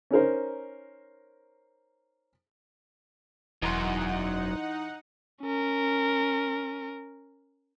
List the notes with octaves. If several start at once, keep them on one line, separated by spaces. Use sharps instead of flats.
C#4 D#4 A#4 C5
E1 F#2 E3 D#4 F#5 A#5 C6
C#4 A#4